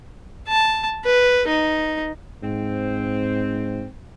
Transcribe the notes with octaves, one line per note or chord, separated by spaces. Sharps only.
A5
B4
D#4
G#2 C4